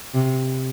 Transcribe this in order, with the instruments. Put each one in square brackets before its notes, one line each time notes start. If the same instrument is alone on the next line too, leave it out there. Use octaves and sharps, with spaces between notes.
[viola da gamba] C3